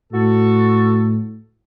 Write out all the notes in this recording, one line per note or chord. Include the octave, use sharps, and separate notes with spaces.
A2 F#4 A4